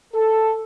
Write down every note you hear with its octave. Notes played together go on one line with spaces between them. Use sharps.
A4